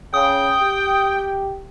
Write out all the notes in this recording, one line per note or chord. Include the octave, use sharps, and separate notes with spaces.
C#3 G5 D#6
G4